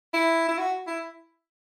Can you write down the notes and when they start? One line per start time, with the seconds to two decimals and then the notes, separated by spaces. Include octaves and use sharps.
0.14 E4
0.48 E4
0.58 F#4
0.87 E4